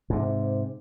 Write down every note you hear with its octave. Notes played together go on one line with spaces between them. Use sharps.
G#2 C3